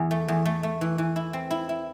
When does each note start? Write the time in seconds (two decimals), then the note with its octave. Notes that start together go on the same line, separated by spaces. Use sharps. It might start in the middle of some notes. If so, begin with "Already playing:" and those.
Already playing: E2
0.11 A3
0.28 E2
0.45 A3
0.63 A3
0.81 E3
0.98 E3
1.16 E4
1.33 C4
1.51 E4
1.69 E4